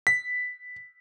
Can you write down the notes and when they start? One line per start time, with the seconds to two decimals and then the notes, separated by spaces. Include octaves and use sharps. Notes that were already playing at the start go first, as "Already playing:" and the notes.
0.07 B6